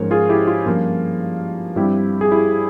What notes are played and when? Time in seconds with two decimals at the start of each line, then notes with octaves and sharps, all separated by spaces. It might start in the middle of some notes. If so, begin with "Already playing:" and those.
Already playing: G#2 F3 G#3 C#4 A#4 C5 C#5
0.11 F4 G#4
0.29 E4 G4
0.47 F4
0.66 G2 F3 A#3 C#4 F4
1.76 G2 G3 C4 E4 G4
2.21 G#4
2.31 E4 G4